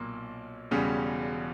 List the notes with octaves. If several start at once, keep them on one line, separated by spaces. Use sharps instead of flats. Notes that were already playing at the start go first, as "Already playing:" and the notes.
Already playing: B1 A#2 A#3
E1 E2 C#3 G3 C#4